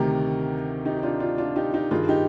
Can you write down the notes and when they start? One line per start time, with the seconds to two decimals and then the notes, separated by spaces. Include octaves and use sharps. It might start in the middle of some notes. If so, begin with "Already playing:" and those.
Already playing: D2 C3 D#3 G4 A#4
0.85 D#4 G4
0.97 G4
1.03 D4 F4
1.20 D4 F4
1.38 D4 F4
1.56 D#4 G4
1.74 D#4 G4
1.91 G2 D#3 F4 G#4
2.09 D#4 G4